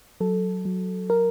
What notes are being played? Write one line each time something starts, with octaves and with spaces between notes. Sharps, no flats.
F#3 A4
F#3
A#4